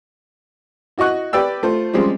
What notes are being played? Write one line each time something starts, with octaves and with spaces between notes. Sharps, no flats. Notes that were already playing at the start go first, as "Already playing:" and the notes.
E4 F#4 D#5 C#6 F#6
G4 B4 D5 G5 E6
A3 F4 C5
F3 G3 G#3 C4 C#4 F4